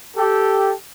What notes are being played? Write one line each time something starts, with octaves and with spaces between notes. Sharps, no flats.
G4 A4